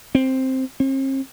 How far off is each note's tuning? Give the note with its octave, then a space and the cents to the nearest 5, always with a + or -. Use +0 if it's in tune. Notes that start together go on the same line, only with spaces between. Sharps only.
C4 +5
C4 +45